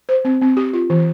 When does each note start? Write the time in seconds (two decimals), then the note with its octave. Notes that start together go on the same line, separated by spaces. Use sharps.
0.09 C5
0.25 C4
0.41 C4
0.57 G4
0.73 F4
0.90 E3